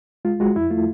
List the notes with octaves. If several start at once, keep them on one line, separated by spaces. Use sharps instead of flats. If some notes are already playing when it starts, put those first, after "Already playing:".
G#3 F4
G#3 F#4
F2 E4
A3 F4